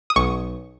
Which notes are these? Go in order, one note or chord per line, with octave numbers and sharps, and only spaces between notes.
D#6
B1 C#6